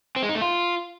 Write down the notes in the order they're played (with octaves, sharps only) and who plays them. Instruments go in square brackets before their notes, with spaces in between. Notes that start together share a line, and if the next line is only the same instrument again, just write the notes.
[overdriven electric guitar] C4
G#3
D#4
A3
F4